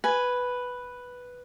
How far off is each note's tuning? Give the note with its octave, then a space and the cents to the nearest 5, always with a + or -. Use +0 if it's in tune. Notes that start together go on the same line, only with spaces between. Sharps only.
B4 +0 G#5 +0